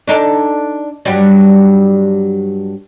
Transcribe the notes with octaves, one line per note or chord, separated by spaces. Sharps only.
D4 D#4 A4
G2 F#3 G3